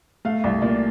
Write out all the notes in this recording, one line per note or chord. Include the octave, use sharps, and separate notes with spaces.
A3 F5
C2
A#2 D5